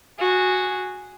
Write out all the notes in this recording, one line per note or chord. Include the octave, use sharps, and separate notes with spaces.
F#4 G#4